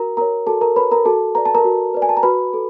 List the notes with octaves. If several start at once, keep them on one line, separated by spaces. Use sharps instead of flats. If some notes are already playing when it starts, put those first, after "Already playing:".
Already playing: F#4 A#4 A#5
A#4 C#5 A#5
F#4 A4 A5
A#4 A#5
A#4 B4 C#5 B5
A#4 A#5
F#4 A4 A5
B4 D5 A#5
A5
A#4 A#5
F#4
B4 D5
G#5
A5
A#5
F#4 B4 B5
A4